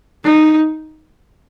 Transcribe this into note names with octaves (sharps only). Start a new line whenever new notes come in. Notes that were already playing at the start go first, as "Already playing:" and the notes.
D#4